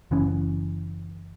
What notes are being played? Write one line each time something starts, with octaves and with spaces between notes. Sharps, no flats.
F#1 E3 C#4